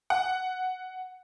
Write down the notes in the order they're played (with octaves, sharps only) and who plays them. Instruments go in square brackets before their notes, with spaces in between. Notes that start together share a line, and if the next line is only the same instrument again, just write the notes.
[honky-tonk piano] F#5